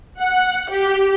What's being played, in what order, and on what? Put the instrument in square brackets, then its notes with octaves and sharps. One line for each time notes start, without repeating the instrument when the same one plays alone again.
[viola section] F#5
G4